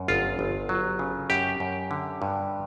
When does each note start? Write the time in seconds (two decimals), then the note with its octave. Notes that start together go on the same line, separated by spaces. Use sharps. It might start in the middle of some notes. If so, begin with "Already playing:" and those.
Already playing: F#2
0.08 G1 F4
0.39 G1
0.69 F#3
0.99 C#3
1.30 F#2 G4
1.60 F#2
1.91 D3
2.22 G2